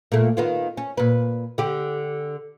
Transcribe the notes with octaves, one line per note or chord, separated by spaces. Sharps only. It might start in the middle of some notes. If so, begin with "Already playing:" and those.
A#2 A3
D#3 B3 F4
C#4
A#2 B4
D3 G4